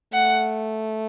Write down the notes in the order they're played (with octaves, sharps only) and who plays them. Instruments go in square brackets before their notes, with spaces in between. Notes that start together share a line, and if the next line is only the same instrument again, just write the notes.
[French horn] A3 [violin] F#5